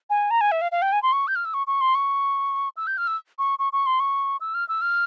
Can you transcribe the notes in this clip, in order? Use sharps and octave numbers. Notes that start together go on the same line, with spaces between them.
G#5
A#5
G#5
E5
F5
F5
G5
G#5
C6
C#6
G6
F6
E6
C#6
C#6
C6
C#6
E6
G6
F6
E6
C#6
C#6
C#6
C6
C#6
E6
F6
E6
F6